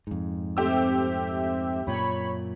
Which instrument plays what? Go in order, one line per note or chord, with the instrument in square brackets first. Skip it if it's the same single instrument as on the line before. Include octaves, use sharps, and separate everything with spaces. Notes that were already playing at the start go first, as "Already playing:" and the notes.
[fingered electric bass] F2 G#2
[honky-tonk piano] A3 G4 E6 [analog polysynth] C4 E5
[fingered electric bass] F#2 A#2 [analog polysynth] C#5 B5